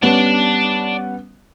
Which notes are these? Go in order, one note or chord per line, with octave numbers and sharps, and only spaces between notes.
G3 B3 C#4 D5 A5